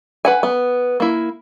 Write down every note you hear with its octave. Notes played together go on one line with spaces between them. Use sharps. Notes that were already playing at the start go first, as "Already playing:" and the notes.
B4 F#5 G#5
B3
A#3 E4